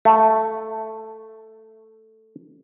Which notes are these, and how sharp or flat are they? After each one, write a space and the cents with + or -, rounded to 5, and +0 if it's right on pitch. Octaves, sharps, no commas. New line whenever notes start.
A3 +5